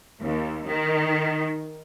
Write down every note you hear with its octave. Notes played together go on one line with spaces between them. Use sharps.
D#2
D#3